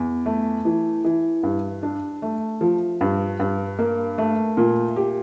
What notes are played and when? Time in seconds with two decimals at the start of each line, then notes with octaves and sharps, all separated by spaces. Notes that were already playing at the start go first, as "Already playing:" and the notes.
Already playing: E2
0.26 A3
0.65 E3
1.04 E3
1.43 G2
1.83 D4
2.22 A3
2.61 F3
3.01 G2
3.40 G2
3.79 A#3
4.18 A3
4.57 A#2
4.96 G4